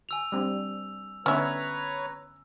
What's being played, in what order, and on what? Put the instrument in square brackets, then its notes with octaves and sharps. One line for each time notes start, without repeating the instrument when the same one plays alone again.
[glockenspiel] G#5 E6 F7
[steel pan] G3 C4 D4
[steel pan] D3 B3 [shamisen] C#4 E5 [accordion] B4 C#5 A#5